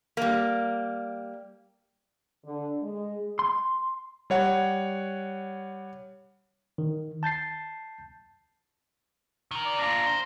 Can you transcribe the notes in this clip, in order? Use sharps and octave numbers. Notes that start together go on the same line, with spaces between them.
G3 A#3
D3
G#3
C6
G3 C#5 F#5
D#3
A5 G6 A6 C7
D#3 A#4
D5
D4 F4 A#5
C5